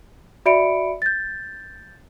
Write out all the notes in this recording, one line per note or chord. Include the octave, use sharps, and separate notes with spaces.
F#4 D5 E5 B5 C#7 D7
G6 A6